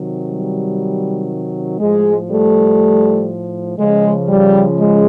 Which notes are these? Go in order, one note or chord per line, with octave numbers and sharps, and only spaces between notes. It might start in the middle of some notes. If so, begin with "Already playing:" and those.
Already playing: C3 D#3 F#3
G3
A2 F3 G#3
G3 A3
C#3 F3 G#3
G3
G#3